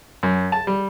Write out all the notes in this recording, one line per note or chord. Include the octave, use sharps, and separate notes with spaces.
F#2
A5
G3